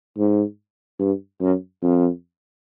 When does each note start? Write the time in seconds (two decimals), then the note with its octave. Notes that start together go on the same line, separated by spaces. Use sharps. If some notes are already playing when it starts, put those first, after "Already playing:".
0.18 G#2
1.00 G2
1.41 F#2
1.83 F2